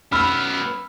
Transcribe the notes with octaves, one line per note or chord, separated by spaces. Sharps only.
F#2 B3 B5 E6 F6